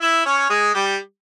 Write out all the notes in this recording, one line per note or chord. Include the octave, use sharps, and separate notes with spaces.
E4 E5
C#4 C#5
G#3 G#4
G3 G4